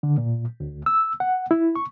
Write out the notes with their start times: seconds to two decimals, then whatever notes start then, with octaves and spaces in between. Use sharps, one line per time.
0.03 D3
0.18 A#2
0.60 D2
0.86 E6
1.20 F#5
1.51 E4
1.76 C#6